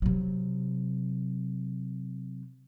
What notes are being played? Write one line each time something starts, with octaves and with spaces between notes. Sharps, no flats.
C3 F#3